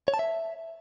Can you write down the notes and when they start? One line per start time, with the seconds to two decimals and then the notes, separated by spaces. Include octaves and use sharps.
0.08 C#5
0.14 A5
0.19 E5